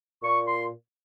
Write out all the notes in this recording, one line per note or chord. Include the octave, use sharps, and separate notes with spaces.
A#2 C#6
C6